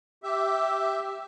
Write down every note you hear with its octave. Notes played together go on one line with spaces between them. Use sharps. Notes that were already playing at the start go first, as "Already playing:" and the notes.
G4 E5